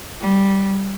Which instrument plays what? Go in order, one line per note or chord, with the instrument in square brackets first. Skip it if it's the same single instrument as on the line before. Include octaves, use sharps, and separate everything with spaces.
[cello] G3